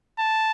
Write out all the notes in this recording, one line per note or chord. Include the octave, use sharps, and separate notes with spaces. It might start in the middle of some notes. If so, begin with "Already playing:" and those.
A5